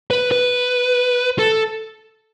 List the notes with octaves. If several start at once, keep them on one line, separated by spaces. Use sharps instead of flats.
B4
B4
A4